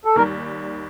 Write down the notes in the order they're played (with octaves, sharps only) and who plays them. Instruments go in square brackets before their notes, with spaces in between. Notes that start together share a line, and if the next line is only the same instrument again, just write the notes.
[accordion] A4
[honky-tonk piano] D#2 D#3 G3 [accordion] A#4